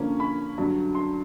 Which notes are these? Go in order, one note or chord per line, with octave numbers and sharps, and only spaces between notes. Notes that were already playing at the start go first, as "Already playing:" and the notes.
Already playing: D3 F3 A#3 C#4
B5
G2 D3 F#3
C6